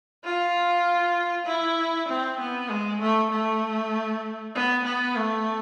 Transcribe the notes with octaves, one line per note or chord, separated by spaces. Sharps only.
F4
E4
C4
B3
G#3
A3
A3
B3
B3
A3